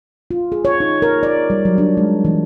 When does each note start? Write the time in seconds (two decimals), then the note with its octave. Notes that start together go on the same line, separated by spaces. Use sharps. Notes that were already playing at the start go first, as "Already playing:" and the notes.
0.31 F4
0.52 G#4
0.65 C#5
0.80 D#4
1.02 A#4
1.23 D5
1.50 G3
1.65 F#3
1.78 D4
1.97 G#3
2.25 E3